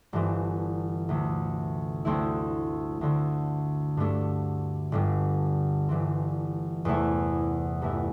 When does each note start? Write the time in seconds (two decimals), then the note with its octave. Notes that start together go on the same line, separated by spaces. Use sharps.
0.13 G1 G2 E3 C4
1.09 D2 C3 A3
2.05 D2 D3 A3 C4 E4
3.01 D2 D3 C4
3.97 G2 D3 A3 D4
4.92 G1 G2 D3 G3
5.89 G1 G2 E3 C4
6.85 E2 C3 A3 E4
7.82 G1 G2 E3 A3 E4